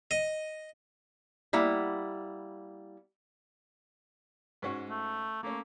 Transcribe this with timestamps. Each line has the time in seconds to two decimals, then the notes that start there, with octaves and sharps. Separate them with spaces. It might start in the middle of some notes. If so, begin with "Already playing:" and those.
0.11 D#5
1.53 G3 A#3 E4 F#5
4.62 G#2 C#4 F#4
4.90 A3
5.43 A3 A#3 C#4